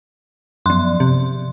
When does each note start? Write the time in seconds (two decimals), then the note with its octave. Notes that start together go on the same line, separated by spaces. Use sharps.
0.66 F#2 F3 C6
1.00 C3